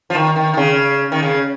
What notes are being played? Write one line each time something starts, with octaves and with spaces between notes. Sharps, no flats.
F3
D#3
D#3
D#3
C#3
D#3
C#3